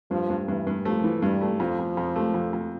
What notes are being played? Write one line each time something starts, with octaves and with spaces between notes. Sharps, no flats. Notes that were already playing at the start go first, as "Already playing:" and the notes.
G2 F3
G2
G2 E3
G2
F3 A3
E3
G2 G3
A3
F2 F3
F2
F2
A3
F2
F2